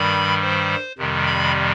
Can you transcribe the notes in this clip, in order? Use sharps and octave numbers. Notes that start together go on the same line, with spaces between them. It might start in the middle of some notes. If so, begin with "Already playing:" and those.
Already playing: G2 D#3 G3 B5
C5
F2 C3 D#3 G3
B5